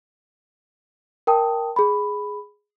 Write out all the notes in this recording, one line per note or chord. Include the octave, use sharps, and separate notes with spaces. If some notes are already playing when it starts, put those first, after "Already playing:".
A#4 G5 A5 D#6
G#4 B5